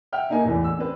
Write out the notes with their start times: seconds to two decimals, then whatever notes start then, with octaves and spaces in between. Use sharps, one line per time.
0.12 E5 F#5 G5 F6
0.30 A#3 D#4 A#4 G#5
0.45 A1 E2 A2 E3
0.64 E6
0.78 C4 D4 B4